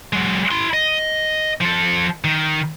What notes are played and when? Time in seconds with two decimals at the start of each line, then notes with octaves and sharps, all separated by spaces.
0.13 F#3 G#3
0.51 E4 C6
0.73 D#5
1.61 F3 A4
2.24 D#3